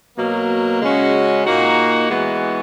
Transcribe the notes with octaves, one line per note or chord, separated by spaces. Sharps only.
B2 F#3 A#3
C#3 G#3 C#4 F#4
A#2 A#3 D#4 F#4
E3 G#3 B3 F#4